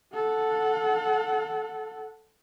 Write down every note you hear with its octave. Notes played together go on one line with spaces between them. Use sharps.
A4 F#5